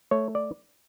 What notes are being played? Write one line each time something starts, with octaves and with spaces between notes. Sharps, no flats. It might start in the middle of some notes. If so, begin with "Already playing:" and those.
A3 C#5
D5